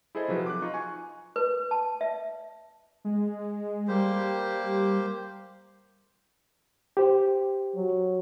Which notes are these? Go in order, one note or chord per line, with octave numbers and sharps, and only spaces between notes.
E4 G#4 A4 C5 D#5
C3 F3 F#3 G#4 B4
D6 F#6
D#4 F4 C#6
G#5 C#6
B4
A5
E5
G#3
G3 A#3 G4 C5
G4 C5
F#3